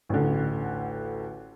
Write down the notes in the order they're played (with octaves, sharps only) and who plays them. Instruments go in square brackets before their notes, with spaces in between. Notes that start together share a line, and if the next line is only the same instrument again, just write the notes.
[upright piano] A1 D2 D3